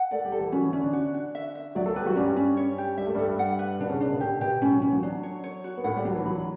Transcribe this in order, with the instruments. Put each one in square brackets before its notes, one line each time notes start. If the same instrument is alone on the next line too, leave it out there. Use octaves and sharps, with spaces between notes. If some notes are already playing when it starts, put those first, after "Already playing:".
Already playing: [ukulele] F#5
[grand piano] A3 A4 [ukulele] D5
[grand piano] G3 G4
[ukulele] A4
[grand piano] E3 E4
[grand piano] F#3 F#4 [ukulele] C#4
[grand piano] E3 E4
[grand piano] D3 D4 [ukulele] C#4
[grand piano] D3 D4
[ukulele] F#4
F#4
E5
E5
[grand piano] F#3 F#4 [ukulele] D5
[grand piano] A3 A4
[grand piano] G3 G4 [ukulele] B4
[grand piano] F#3 F#4
[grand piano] G2 G3 [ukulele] C#4
[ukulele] C#4
C#5
G4
[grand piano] G3 [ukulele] E5
[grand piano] A3
[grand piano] G2 G3 [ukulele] A4
[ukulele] F#5
B4
[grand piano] B2 B3 [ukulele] D4
[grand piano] C#3 C#4
[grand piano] C#3 C#4 [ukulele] D4
[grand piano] B2 B3
[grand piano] A2 A3 [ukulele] G4
[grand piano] B2 B3 [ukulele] G4
[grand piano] A2 A3 [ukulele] C#4
[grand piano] F#3
[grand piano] E3 [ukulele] C#4
[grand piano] F#3
[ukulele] D4
C#5
C#5
F#4
[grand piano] B3
[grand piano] A2 A3 [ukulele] F#5
[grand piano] G3
[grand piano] F#3 [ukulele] D4
[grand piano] E3
[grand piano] F#3 [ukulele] B5